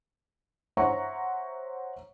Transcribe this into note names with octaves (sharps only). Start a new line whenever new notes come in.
C5 C#5 E5 F#5 A#5 C#6